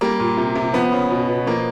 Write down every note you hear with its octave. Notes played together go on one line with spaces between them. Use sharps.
G3 A#3
A#2
C3
C3
F3 B3
C#3
B2
B2
F3 A#3